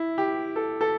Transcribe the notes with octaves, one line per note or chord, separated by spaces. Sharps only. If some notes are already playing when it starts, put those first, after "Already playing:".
Already playing: E4
G4
A4
A4